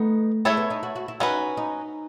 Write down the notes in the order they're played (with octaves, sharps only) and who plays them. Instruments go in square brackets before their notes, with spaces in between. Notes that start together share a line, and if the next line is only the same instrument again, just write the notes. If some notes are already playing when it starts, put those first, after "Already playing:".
Already playing: [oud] A3 [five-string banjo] B3 D#4
[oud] G#3 [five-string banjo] A3 E4 A4 C#5
[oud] B3
D#4
F#4
F#4
E4
[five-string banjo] C#4 F#4 B4 [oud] D#4
[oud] D#4